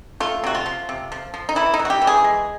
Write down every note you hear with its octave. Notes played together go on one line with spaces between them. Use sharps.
A3 F4
C3 F#4
F4
F3
C3
F3
F3
D#4
E3 E4
D#4
E3
F#4
G4
E3
G#4
G#3